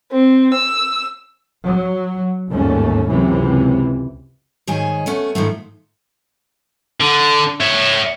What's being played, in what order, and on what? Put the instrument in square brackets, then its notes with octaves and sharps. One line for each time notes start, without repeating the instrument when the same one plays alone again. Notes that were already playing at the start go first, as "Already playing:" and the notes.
[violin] C4
E6
[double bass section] F#3
G1 D#2 G#2 A3 C#4
C#2 F#2 C3 E3
[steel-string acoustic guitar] G#2 D#3 C#4 G#4 G#5
A3 B3 C#4
G#2 D#3 F3 A3
[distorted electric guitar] D3
C#5 E5